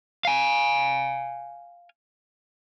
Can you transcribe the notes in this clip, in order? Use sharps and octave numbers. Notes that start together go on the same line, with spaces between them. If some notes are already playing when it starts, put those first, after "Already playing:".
F5 G#5